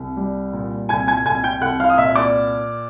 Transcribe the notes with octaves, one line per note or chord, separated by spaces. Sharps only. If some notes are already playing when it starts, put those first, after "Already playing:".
Already playing: C2
G3
A#2
C2 G#5 G#6
G#5 G#6
C2 G#5 G#6
G5 G6
C2 F#5 F#6
F5 F6
D#6
A#2 E5 E6
D5 D6